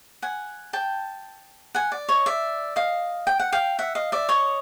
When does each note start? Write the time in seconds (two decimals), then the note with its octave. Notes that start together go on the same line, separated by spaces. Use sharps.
0.22 F#5 G#5
0.73 G5 A5
1.75 F#5 G#5
1.92 D5
2.08 C#5 D#5
2.26 D5 E5
2.76 D#5 F5
3.27 G5
3.40 F#5
3.52 F5 G5
3.79 E5 F#5
3.95 D#5 F5
4.12 D5 E5
4.29 C#5 D#5